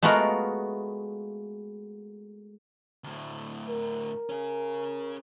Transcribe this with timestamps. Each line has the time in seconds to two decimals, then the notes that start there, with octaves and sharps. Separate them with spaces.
0.03 G#3 A3 B3 F4 F#4 A#4
3.04 D2 A2
3.69 A#4
4.29 C#4 G#4